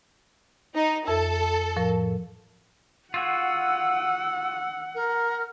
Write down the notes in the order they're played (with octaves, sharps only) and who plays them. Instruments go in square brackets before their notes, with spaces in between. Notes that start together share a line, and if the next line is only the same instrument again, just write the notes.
[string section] D#4
[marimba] F2 E5 E6 [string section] A4
[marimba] A2 F3 A#4
[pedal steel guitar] F4 F#4 G#4 [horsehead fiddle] F#5 [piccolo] E6
[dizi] A#4